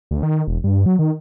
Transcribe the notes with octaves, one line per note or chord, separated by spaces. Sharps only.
D2
D#3
E1
G2
F#3
D#3